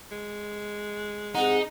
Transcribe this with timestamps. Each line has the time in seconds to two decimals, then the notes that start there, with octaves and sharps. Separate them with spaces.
0.11 G#3
1.35 C3 C4 D#4 G#4 F#5